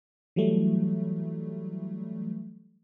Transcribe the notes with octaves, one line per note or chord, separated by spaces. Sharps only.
E3 F#3 G3 A3